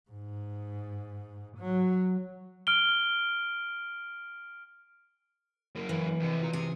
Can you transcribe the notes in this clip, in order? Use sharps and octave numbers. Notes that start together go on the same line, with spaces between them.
G#2
F#3
F6 D7 G7
F#2 A#3
E3
F2 C3
F4 A#5
C3 G#4